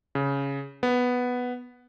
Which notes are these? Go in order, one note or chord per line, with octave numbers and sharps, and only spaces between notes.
C#3
B3